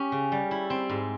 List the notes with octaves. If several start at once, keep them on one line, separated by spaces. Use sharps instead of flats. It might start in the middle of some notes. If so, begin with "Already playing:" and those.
Already playing: C#4 G4
C#3
G3
E4
C4
G#2